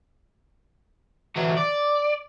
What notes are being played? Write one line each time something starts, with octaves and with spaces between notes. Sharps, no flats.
E3 F#3
D5